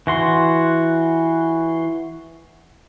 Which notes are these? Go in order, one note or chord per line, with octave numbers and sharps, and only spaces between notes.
E3 F#4 C6